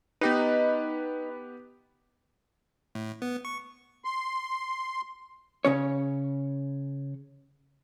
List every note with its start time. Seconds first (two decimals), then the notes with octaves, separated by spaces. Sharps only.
0.21 B3 D#4 G4 B4
2.95 A2
3.22 B3
3.45 C#6
4.05 C6
5.65 C#3 C#4 C#5